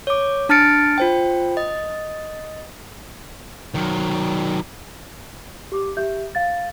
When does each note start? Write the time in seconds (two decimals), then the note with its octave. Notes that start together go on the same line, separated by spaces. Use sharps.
0.07 C#5 D6
0.49 D4 A5 F6 A6 C#7 D7
0.98 F4 C5 G5
1.57 D#5
3.74 D#3 F#3
5.72 G4 D6
5.97 G4 E5 G6
6.35 F5 A6